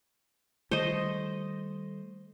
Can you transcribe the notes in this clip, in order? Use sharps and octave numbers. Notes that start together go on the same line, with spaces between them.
D#3 G3 A3 C5 D#5